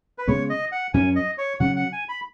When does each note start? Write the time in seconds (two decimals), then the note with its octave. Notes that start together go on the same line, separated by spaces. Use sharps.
0.18 B4
0.27 C#3 G#3 B3 C#5
0.50 D#5
0.72 F#5
0.94 F#2 F#3 C#4 G#5
1.16 D#5
1.38 C#5
1.60 C#3 F#3 C#4 F#5
1.76 F#5
1.93 G#5
2.09 B5